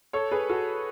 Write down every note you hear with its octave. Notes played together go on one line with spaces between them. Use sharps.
A4 C#5
G#4 B4
F#4 A4